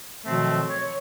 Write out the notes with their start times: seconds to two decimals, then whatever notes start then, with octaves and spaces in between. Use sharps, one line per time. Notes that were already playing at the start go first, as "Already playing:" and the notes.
0.25 B2 D#3 F3 F#3 A3 C4
0.69 C#5